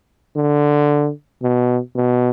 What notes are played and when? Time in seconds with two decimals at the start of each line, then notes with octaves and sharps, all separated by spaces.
0.36 D3
1.43 B2
1.95 B2